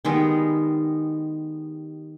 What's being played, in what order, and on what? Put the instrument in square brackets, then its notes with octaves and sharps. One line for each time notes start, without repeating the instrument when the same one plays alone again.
[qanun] D#3 G3 G#3 B3